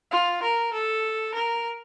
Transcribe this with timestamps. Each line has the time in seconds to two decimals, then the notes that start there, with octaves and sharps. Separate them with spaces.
0.11 F4
0.42 A#4
0.73 A4
1.34 A#4